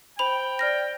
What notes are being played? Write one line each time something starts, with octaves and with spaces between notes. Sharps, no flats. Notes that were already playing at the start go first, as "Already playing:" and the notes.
C5 G5 B5 F7
D5 F6 A#6